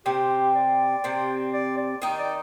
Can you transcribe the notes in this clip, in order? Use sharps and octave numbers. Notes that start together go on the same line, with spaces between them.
C3 C4 G4
D5
C3 C4
D5
D5
D#3 D#4
D5